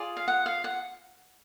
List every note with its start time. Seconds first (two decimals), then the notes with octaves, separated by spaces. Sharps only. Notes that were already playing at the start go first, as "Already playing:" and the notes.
Already playing: F4 G#4 D5
0.17 F5
0.28 F#5
0.46 F5
0.64 F#5